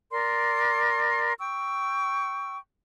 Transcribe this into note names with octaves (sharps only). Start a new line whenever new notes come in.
A#4 D5 C6
G5 C#6 E6